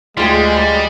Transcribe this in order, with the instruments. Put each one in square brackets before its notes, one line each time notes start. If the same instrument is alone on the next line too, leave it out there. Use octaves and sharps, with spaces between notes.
[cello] D2 [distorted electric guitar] G3 [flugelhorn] G#3 [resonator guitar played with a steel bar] F4 G#4 G5